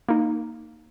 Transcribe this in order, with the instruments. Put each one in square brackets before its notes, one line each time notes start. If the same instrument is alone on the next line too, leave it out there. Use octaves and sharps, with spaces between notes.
[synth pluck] A#3 D#4